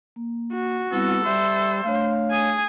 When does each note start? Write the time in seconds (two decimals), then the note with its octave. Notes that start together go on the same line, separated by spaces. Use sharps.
0.16 A#3
0.53 F#4
0.92 G3 B3 C4 E4 A4
1.25 G3 C5 E5
1.84 A3 D4 C#5 F5
2.31 G#4 G#5